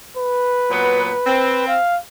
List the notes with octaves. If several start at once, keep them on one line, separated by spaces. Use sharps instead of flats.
B4
A#2 F#3 B3
C4
F5